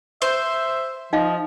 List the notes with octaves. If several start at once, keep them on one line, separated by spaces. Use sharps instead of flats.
C5 E5
F3 D#4 D#5 F5